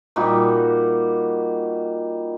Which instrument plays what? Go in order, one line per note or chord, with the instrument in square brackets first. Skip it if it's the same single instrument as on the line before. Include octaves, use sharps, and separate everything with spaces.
[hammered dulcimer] A#2 G3 D#4 F#4